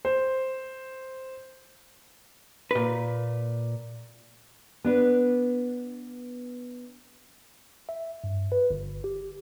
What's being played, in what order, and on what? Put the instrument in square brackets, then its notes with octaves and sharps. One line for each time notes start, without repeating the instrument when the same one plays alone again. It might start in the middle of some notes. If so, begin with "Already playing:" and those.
[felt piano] C5
[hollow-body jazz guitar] A#2 B4
[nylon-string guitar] B3 D4 B4
[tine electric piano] E5
G2
B4
G1
G4